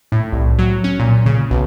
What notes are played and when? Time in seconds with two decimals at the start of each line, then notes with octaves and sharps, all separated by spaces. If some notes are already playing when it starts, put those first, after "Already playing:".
0.12 A2
0.32 C2
0.59 F#3
0.84 C#4
1.00 A#2
1.26 C#3
1.51 B1